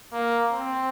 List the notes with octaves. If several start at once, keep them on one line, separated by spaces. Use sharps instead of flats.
A#3
C4